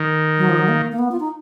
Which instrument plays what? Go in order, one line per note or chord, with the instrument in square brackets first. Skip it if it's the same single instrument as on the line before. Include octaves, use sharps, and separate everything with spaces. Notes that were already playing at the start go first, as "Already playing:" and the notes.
Already playing: [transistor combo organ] D#3
[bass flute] F#3
F3
F#3
A#3
A#3
B3
F4
D#4